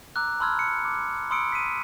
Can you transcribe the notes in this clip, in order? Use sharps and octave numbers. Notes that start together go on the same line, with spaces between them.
A#5 D6 E6 F#6
A5 B5 C6 E6 F6 G#6
C#7
D6
B5 C6 D#6 E6 C#7 D7
B6 D#7